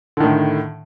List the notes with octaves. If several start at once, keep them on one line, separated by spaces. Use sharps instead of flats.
A2 D3 D#3